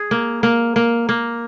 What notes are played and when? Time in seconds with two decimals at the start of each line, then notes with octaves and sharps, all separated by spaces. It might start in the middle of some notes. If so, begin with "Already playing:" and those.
Already playing: G#4
0.11 A#3
0.43 A#3
0.76 A#3
1.09 A#3